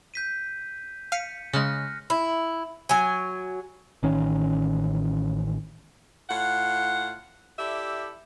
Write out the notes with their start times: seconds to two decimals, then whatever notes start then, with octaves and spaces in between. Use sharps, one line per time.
0.14 G6 B6 D#7
1.12 F5 B6 C#7 D#7
1.53 C#3 G#3 F6 F#6 A#6
2.10 E4
2.89 F#3 G#5
4.03 A1 D#3 C#4
6.30 A2 F4 F#5
7.59 E4 G4 A4 D5 E5